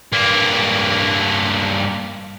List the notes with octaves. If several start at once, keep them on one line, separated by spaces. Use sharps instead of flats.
G2 A#3